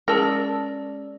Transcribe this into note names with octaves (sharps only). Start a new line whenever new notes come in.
G#3 C#4 G#4 A#4 D5 A5 E6 A#6